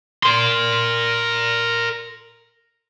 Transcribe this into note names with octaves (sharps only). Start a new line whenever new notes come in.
A#4 C6